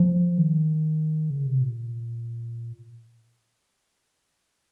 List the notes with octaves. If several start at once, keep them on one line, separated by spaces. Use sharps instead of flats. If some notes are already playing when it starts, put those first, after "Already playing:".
Already playing: F3
D#3
C#3
C3
A#2